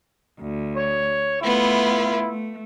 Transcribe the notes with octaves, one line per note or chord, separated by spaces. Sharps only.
D2
C#5
A3 B3 E4 F4
A3